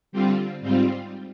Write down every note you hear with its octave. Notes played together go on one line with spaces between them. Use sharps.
D3 G3 C4 F4
G#2 G3 C4 F4